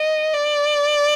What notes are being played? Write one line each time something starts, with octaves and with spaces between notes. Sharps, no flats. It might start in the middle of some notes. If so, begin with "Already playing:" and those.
Already playing: D#5
D5